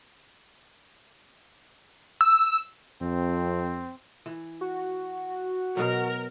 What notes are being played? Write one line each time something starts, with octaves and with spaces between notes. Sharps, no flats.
E6
F2 C4
E3
F#4
B2 F#3 A#4